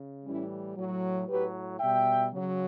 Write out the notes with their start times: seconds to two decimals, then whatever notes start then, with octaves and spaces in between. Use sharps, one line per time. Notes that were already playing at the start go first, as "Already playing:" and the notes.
Already playing: C#3
0.26 A2 E3 G3 C#4 E4
0.77 A2 F#3
1.28 A2 F#3 G4 B4
1.79 B2 G3 E5 G5
2.31 C#3 F#3